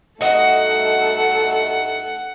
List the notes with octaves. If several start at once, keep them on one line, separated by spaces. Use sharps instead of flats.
G2 A3 D#4 F#4 A4 D#5 F#5